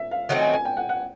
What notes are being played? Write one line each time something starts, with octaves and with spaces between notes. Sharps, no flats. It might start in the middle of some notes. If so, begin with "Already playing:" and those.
Already playing: E5
F5
D#3 F#3 A3 C4 F#5
G#5
G#5
G5
F#5
F#5